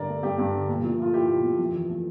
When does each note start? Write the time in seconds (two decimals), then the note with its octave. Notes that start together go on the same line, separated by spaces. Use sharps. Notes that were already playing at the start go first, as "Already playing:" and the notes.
Already playing: G2 D3 A#4 D5
0.08 A3
0.23 G2 G4
0.38 G2
0.53 D3
0.69 A#2
0.83 F3
0.98 A3 F4
1.13 E4 G4
1.29 A#2
1.44 F3
1.59 F2
1.74 E3
1.89 A3